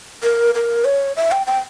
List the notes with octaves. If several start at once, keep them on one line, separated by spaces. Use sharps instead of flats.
A#4
A#4
C#5
E5
G5
G5